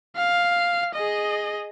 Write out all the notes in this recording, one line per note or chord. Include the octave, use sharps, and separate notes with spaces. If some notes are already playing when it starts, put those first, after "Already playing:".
F5
G#4 D#5